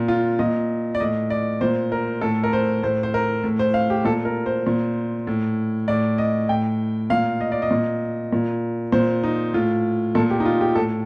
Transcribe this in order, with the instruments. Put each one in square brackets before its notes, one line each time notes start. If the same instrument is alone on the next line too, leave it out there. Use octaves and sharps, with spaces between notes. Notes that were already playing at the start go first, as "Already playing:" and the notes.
Already playing: [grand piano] A#2
F4
A#2 D#5
D5
A2 D#5
D5
A#2 C5
A#4
A2 A4
A#4
C5
A2 C5
C5
A#4
A2
C5
F5
G4
A#2 A4
A#4
C5
A#2
A2
A2 D5
D#5
A2 G5
A#2 F5
D#5
D5
D#5
A#2
A#2
A#2 C5
D#4
A2 F4
A#2 A4
G4
D#4
F4
G4
A2 A4